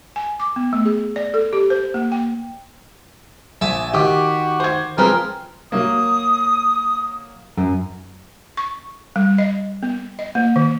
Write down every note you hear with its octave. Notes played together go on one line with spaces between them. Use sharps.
G#5
D6
B3
A3
G#4
D5
A4
G4
C5
A#3
G5
A#1 E5 G#5 A5
D#3 F#4 G4 D6
C5 G#6
F3 G#3 C4 A#4 B4
F#3 A#3 D#6
F#2
C#6
G3
D#5
B3
D#5
A#3
D#3